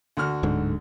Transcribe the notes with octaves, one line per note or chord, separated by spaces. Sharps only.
D2 F#4 F6
D1 G#2 D3